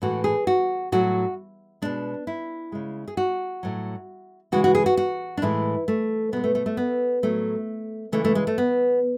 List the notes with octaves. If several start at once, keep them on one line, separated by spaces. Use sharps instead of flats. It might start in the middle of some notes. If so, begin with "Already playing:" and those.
A2 E3 G#3 F#4
G#4
F#4
A2 F#3 F#4
B2 G#3 D4
E4
C#3 G#3
G#4
F#4
A2 F#3
C#3 E3 G#3 F#4
F#4
G#4
F#4
F#4
D4
A2 E3 G#3 E4
A3
B2 G#3 B3
A3
A3
A3
B3
A2 F#3 A3
C#3 E3 G#3 A3
A3
G#3
A3
B3